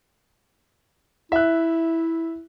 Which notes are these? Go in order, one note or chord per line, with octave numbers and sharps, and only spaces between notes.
E4 E5 F#6